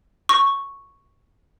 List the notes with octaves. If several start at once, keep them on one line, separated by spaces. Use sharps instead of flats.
C#6